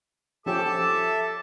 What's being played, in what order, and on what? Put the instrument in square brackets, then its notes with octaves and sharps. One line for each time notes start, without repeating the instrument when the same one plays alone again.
[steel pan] F3 C#4 G4 [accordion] A4 E5 A5 [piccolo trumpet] D6